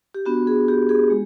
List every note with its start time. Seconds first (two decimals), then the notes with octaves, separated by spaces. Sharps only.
0.14 G4
0.26 B3 D4 F#4
0.47 G#4
0.68 G4
0.89 G#4
1.10 G#3